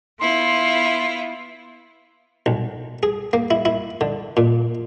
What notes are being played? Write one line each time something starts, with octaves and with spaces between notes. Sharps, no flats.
B3 E4 F4 C6
B1
G#4
A#3
E4
E4
D3
A#2